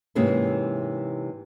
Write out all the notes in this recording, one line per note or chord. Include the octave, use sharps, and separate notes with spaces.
G#2 C3 E3 A#3 C#4 E4